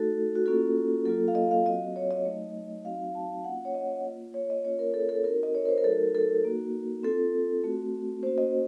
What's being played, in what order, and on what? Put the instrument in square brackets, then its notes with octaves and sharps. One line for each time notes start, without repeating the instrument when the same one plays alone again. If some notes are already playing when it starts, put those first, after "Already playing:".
Already playing: [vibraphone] A3 D#4 F#4 A4
F#4
A#3 C#4 F4 A4
F#3 A#3 F4 A4
F5
D#5
F5
F#3 C4 F#4 D#5
C#5
D#5
F#3 A3 D#4
F#3 C4 D#4 F#4 F5
A5
A#3 C#4 F4 F#5
C#5
D#5
A#3 F4
C#5
D#5
A#3 C#4 F4 C#5
A#4
A4
A4
C4 D#4 F#4 A#4
D#5
C#5
A#4
C5
A#4
F#3 A3 D#4 F#4 A4
A4
A#3 D#4 F#4
C4 F4 A4
A3 C4 F#4
A#3 C#4 F#4 C5
D#5